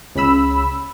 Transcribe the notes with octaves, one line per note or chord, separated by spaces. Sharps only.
C#2 C#3 B5 E6